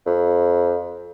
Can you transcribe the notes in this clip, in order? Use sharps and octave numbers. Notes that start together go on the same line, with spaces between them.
F2